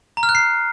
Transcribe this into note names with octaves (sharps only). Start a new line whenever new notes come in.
A#5
F6
F#6
C7